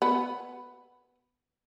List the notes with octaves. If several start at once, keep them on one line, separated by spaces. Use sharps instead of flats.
B3